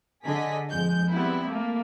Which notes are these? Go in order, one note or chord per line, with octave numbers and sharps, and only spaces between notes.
D3 G#4 D#5 B6
F2 G#3 G6
G3 B3 C4 E4
A3 A#3